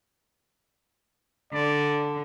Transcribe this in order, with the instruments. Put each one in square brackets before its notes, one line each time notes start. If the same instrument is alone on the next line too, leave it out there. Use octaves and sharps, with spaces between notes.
[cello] D3 [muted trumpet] D5